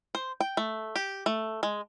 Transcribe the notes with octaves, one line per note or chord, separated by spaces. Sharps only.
C5
G5
A3
G4
A3
G#3